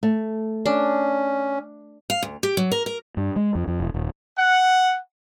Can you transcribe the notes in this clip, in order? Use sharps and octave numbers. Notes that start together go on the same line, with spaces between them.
A3
C#4 D4
F5
D2
G4
F#3
A#4
A#4
G2
G#3
F2
F2
E1
D#1
F#5